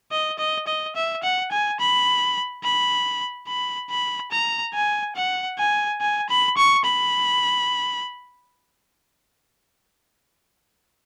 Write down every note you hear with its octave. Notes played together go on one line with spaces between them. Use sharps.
D#5
D#5
D#5
E5
F#5
G#5
B5
B5
B5
B5
A#5
G#5
F#5
G#5
G#5
B5
C#6
B5